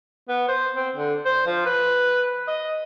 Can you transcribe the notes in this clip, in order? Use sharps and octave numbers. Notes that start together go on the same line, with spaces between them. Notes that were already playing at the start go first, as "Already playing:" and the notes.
B3
C5
C4
D3
C5
F3
B4
D#5